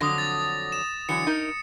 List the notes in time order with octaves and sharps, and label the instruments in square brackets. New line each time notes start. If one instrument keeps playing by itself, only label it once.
[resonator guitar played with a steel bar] F2 D3 F#3 [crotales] D#6 A#6
[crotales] A6
E7
[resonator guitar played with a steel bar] D3 E3 F#3 [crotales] C#7
[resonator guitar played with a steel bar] D#4 A#4